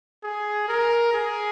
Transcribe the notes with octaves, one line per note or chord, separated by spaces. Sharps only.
G#4
A#4
G#4